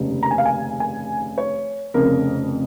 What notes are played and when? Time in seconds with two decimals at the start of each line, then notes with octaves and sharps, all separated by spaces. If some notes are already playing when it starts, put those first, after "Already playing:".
Already playing: F1 D#2 C#3
0.23 A#5
0.31 G#5
0.38 F5
0.45 G#5
0.80 G#5
1.38 C#5
1.94 F1 F2 C#3 A#4